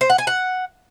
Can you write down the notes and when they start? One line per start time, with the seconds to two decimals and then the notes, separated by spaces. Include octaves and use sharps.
0.01 C5
0.10 F#5
0.18 G#5
0.27 F#5